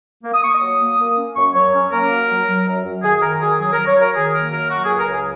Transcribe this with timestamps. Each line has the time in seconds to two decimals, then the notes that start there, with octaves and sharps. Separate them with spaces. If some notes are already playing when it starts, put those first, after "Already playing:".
0.24 A#3
0.34 D#6
0.42 A#3 C#6
0.55 D#6
0.61 F#3
0.80 A#3
0.99 A#3
1.17 C#4
1.36 F#2 C#6
1.54 F#3 C#5
1.72 C#4 C#5
1.92 A#3 A#4
2.10 F#3
2.29 F#3
2.47 F#3
2.67 F#2
2.84 F#2
3.03 D#3 G#4
3.22 D#3 A#4
3.41 F#2 G#4
3.59 F#3 G#4
3.73 A#4
3.78 F#3
3.87 C#5
3.96 F#3 A#4
4.15 D#3 G#4
4.34 A#3 A#4
4.52 F#2 A#4
4.71 F#3 F#4
4.85 G#4
4.90 C#2
4.99 A#4
5.09 C#3
5.14 G#4